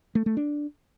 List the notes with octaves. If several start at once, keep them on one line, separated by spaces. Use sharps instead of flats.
A3
A3
D4